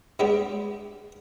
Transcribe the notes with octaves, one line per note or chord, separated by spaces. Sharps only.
G2 G3 G#3 B3 D4